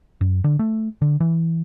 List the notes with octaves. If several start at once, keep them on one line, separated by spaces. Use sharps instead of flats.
F#2
D3
A3
D3
E3